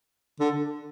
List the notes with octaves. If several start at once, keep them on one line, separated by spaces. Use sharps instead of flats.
D3